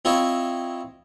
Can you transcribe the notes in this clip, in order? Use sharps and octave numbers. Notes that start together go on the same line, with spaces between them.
C4 E4 F4 C#5 D#5 E5